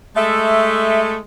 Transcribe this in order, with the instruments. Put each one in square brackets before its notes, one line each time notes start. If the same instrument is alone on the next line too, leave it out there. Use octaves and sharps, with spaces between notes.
[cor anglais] G#3 [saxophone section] A3 [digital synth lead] E5